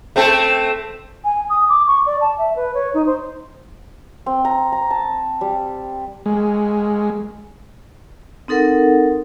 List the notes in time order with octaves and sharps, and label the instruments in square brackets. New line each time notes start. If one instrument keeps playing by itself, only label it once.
[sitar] A3 C4 A4
[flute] G#5
D#6
D6
C#6
D5
A5
E5
B4
C#5
D#4
C5
[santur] C4
A#5
A#5
A5
G3
[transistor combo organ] G#3
[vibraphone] C4 D#4 A4 A#4 F#5